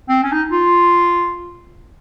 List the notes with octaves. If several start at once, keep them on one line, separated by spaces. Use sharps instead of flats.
C4
C#4
D#4
F4